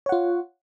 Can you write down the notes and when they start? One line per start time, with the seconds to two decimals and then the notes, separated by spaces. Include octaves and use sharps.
0.06 C#5
0.09 F#5
0.12 F4